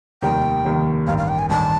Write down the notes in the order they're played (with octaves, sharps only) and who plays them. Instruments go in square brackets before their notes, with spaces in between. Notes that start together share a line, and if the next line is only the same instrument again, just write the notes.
[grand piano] F1 D#2 D#3 G3 [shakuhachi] G5
[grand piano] F1 D#2 D#3 G3
[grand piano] A1 G2 D#3 [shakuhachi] F5
[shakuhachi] F5
G5
G#5
[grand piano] A1 G2 D#3 [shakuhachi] A5